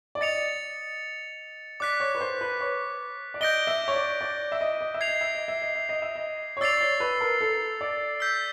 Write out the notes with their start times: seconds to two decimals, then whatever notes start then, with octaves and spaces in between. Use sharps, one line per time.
0.15 D5
0.21 D#5 A6 C#7 F7
1.80 D5 D6 F#6 B6
2.00 C#5
2.15 B4
2.21 C5
2.41 B4
2.61 C#5
3.34 D5
3.41 D#5 G6 A#6 D7 G7
3.67 E5
3.88 C#5
3.94 D5
4.21 D5
4.52 E5
4.61 D#5
4.81 D#5
4.94 E5
5.01 G#6 C7 F7
5.08 D#5
5.21 E5
5.35 D#5
5.48 E5
5.62 D#5
5.75 E5
5.89 D#5
6.02 E5
6.16 D#5
6.57 C#5
6.61 D5 E6 A6 C7 F7
6.81 C#5
7.00 B4
7.21 A#4
7.41 A4
7.81 D5
8.20 E6 G6 B6